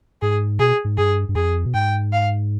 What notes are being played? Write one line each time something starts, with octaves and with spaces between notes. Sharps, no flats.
G#2 G#4
B2 G#4
G#2
G2 G#4
G2
F2 G#4
B2
G#2 G5
F5